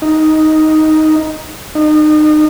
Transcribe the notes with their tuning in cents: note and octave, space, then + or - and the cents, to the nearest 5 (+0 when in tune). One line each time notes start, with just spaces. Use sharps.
D#4 +5
D#4 -30